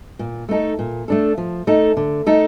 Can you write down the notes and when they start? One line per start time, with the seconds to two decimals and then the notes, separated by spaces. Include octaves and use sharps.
0.19 A#2
0.49 A3 D#4 A4
0.79 A#2
1.08 A3 D4 A4
1.38 F3
1.67 A3 D#4 A4
1.97 D3
2.26 A3 D#4 A4